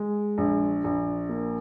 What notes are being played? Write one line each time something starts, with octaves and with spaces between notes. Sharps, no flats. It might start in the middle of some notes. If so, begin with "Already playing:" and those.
Already playing: G#3
A#1
A#1
A#3